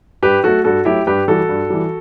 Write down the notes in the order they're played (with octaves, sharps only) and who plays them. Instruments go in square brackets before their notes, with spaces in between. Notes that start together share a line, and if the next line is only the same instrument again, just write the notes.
[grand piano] G2 G4 B4
F#3 A3 F#4 A4
G2 F#4 A4
F#3 A3 E4 G4
G2 G4 B4
E3 G3 F#4 A4
G2
E3 G3